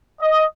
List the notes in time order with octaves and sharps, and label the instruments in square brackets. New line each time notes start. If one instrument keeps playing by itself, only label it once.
[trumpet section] D#5